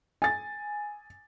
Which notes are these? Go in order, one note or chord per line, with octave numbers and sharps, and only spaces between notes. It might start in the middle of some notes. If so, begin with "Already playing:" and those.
G#5 A6